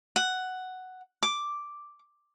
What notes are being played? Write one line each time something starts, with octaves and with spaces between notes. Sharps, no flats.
F#5
D6